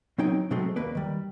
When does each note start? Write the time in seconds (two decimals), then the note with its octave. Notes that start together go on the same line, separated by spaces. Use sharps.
0.18 F#3 C4 D#4 C#5 G5
0.50 B2 F#3 G#3 A3 C4
0.76 D#2 A#3 B4 D5
0.95 D#3 G3